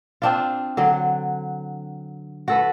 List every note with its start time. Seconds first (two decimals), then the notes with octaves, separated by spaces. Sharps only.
0.22 C4 D4 F4
0.77 D3 F#3
2.48 F#4 A4 B4